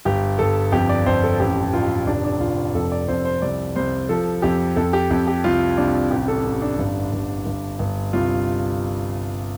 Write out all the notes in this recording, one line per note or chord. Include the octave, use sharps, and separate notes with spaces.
G1 G4
G1 A4
F2 G4
D5
F2 C5
A4
A1 G4
A1 F4
F1 D4
D4
F1 F4
F2 A4
D5
F2 C5
C5
C2 D5
C2 C5
F3 A4
F2 G4
F2 A4
G4
F2
G4
C2 F4
C2 D4
A1 G4
A4
A1
D4
G1
G1
G1
G1
C2 F4